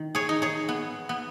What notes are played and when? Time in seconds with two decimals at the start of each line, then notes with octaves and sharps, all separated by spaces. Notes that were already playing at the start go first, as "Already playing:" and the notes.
Already playing: D#3
0.15 G#4 C#5
0.29 D#4
0.42 G#4 C#5
0.69 B3
1.09 B3